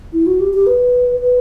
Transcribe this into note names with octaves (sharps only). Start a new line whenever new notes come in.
E4
F#4
G4
G4
B4
B4